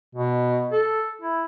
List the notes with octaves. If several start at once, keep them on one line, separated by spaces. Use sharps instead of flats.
B2
A4
E4